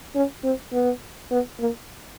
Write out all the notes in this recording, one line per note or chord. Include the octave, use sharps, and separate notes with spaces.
C#4
C4
B3
B3
A#3